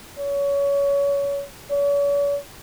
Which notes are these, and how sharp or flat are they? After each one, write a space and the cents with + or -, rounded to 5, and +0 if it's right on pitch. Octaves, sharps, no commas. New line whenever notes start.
C#5 +25
C#5 +45